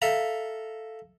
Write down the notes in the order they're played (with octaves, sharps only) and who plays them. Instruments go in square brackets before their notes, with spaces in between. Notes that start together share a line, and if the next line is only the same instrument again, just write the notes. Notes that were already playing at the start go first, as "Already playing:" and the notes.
[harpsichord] A4 E5 F5 A#5